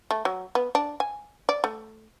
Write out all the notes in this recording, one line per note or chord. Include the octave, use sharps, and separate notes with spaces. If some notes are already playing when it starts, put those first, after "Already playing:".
A3
F#3
B3
D4
G#5
D5
A3